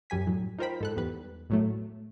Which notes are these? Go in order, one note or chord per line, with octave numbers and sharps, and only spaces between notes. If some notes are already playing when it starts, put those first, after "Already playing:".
F#2 G3 G#5 B6
A2 F#3
D#4 F4 A#4 C5 G5 B5
G#2 A4 F#6
E2 G3 B4
A2 F#3 A3